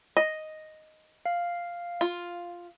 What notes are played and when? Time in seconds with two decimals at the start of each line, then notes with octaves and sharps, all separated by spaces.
0.17 D#5
1.26 F5
2.01 F4